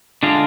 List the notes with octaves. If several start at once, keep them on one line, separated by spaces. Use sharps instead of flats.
D3 G#3 D4 F4